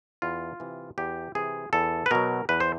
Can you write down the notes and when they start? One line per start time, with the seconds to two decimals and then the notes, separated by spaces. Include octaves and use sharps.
0.22 E2 F4
0.60 C3 E3
0.98 E2 G4
1.35 C3 E3 G#4
1.73 E2 A4
2.06 B4
2.11 B2 F#3 A#4
2.49 E2 B4
2.60 C5